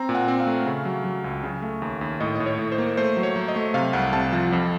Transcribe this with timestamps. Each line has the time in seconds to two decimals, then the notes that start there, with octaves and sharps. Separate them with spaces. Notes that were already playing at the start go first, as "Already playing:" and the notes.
Already playing: C4 A#5
0.09 A#2
0.15 F#5
0.28 C4
0.40 F5
0.47 A3
0.66 C#3
0.85 F#3
1.04 F#3
1.24 C#2
1.43 C#3
1.62 A3
1.82 D#2
2.01 D#2
2.20 A2 D#5
2.35 A2 D#5
2.46 C#5
2.59 A2
2.72 C5
2.78 A#3
2.97 A3 C5
3.17 F#3
3.23 C#5
3.36 F#3
3.48 D#5
3.56 A3
3.74 C3 F5
3.93 C2 F#5
4.13 C3 A5
4.33 F3 A5
4.52 F2